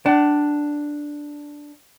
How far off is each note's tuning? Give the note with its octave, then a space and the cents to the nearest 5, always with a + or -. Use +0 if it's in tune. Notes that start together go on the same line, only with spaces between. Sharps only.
D4 +0 F#5 +40